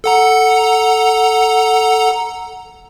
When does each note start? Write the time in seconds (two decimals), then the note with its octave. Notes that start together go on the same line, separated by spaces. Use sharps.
0.04 A4 F#5 A#5